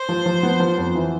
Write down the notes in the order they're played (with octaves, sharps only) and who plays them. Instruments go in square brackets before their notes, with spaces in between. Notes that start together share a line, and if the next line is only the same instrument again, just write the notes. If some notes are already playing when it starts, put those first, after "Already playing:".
Already playing: [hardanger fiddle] C5
[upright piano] F3
F3
B3
F3
F2
E3